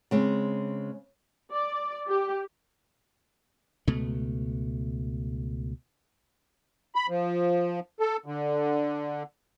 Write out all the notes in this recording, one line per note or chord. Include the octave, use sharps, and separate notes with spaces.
C#3 G#3 C4
D5
G4
C#2 B2 A3
B5
F3
A4
D3